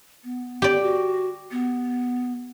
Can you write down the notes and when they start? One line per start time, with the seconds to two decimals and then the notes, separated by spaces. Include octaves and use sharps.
0.24 B3
0.62 G4 D5
0.82 F#4
1.51 B3